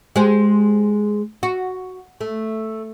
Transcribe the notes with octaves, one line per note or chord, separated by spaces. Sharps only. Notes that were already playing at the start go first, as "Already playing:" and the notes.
G#3 G4 C5
F#4
A3